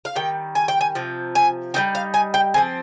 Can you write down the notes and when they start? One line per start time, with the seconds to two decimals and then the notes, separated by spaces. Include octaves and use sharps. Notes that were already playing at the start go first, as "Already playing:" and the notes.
0.05 F5
0.16 D#3 G3 G5
0.55 G#5
0.68 G5
0.81 G#5
0.95 C3 F3
1.35 G#5
1.74 G3 B3 D#4 G5
1.95 F5
2.14 G#5
2.34 G5
2.54 F3 G#3 C4 G#5